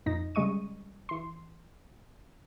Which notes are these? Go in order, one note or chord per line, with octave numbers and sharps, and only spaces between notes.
F2 A#2 D#4 A#6
C#3 G3 G#3 D#5 C#6 D#7
E3 C6